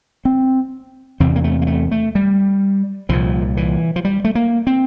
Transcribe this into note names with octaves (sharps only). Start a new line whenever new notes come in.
C4
E2 C3 C4
A#3
A3
A#3
A3
A3
G3
C2 A#2 F3
E3
F3
G3
A3
A#3
C4